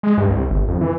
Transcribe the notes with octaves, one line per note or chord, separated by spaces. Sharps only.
G#3
G2
C2
G1
F2
E3